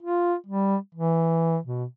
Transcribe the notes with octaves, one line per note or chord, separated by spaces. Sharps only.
F4
G3
E3
B2